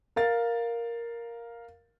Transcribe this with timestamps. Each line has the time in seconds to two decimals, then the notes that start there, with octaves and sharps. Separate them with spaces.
0.16 A#4 F5 A6